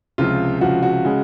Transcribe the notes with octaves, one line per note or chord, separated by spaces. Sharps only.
C#2 C3 F3 F4
C#2 C3 F3 F#4
F#4
C#3 G#3